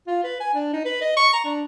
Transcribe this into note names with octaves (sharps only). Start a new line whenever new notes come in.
F4
B4
G#5
D4
D#4
B4
D#5
C#6
A#5
D4